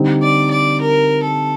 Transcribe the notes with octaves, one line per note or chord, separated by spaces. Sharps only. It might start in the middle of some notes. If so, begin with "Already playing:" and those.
Already playing: D3 G3 C4 D#4
D5
D5
A#4
A4